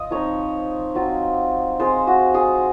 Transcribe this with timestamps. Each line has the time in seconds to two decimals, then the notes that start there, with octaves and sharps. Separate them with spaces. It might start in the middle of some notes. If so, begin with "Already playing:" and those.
Already playing: F4 D#5
0.11 F3 C4 D#4 C#5
0.95 F#3 C4 F4
1.79 G#3 C4 F4 C5
2.07 F#4
2.34 G#4